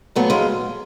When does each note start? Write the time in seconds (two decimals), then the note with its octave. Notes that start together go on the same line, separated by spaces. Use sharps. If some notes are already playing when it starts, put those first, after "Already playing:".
0.15 A#2 F#3 A3 B3
0.30 G#3 A#3